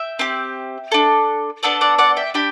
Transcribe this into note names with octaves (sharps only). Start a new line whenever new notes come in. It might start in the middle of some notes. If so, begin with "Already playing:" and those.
Already playing: E5 G5
C4 G4
D4 A4
B3 D4 A4 D5 F#5
D5 F#5
D5 F#5
E5 G5
D4 G4 G5 B5